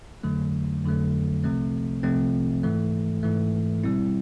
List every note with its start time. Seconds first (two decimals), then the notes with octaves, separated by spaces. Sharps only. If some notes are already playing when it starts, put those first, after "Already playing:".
0.23 F2 D3 F#3 A3
0.84 F2 D3 F#3 A3
1.44 C2 C3 F3 A3 C4
2.03 C2 C3 F3 A3 C4
2.63 G#2 E3 A3
3.23 G#2 E3 A3
3.84 B2 G3 C4 E4